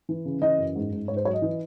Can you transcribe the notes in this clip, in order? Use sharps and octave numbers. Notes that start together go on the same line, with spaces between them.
E3
C#3
E3 D#5
F#2
G#2
G#2
G#2 C#5
C5
F#3 C#5
D#5
E3